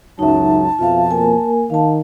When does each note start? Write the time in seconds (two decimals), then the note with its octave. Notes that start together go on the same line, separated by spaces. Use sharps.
0.19 C#2 F#2 F#3 D#4 E5 A5
0.79 F2 B2 F3 F4 E5 F5
1.11 A#3 A#4 G#5
1.70 D#3 F5 A5